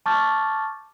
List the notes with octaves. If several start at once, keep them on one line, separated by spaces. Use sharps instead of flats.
A5 C#6 D6 F6 G6 A6